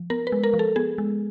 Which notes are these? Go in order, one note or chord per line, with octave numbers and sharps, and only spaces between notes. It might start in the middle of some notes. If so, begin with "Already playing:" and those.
Already playing: F3
B3 A#4
B4
G#3
A#4
F3
A4
B3 G#4
G#3